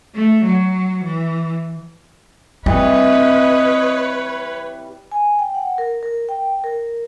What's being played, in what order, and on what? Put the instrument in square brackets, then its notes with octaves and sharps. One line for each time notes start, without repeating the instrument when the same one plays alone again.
[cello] A3
F#3
E3
[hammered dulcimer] E3 G3 [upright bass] C4 [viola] B4 C#5 [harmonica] D#5
[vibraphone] G#5
G5
F#5
A#4
A#4
G5
A#4